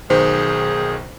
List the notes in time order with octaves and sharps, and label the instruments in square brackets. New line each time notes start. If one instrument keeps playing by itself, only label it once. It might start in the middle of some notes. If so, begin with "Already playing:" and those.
[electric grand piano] B1 D#3 [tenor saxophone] G#4 [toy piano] C5